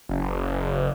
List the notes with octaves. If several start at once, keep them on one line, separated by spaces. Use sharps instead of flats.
F#1